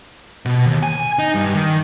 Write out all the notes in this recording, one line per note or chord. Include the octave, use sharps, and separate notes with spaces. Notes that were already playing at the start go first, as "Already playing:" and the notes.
B2
D#2
G#5
D#4
G2
D#3